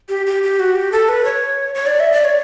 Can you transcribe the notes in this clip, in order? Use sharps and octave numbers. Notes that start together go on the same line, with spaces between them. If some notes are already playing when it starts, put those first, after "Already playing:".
G4
G4
G4
F#4
G4
A4
B4
C#5
C#5
D5
E5
D5
C#5